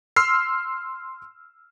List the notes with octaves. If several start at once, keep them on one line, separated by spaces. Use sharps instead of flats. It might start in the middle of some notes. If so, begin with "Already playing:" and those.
C6 E6 F6 C7